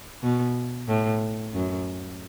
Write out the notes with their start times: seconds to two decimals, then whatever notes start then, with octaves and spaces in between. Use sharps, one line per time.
0.23 B2
0.88 A2
1.54 F#2